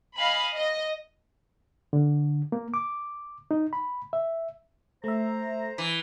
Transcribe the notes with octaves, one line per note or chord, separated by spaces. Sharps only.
D#5 F5 G#5 B5
D#5 A#6
D3
A#3
D6
D#4
B5
E5
A3 C5 E5 A#5
E3